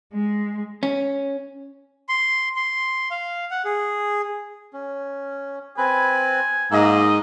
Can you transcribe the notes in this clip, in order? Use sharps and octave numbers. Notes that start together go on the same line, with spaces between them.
G#3
C#4
C6
C6
F5
F#5
G#4
C#4
C4 B4 G#5 B5
G#2 A#3 D#5 E6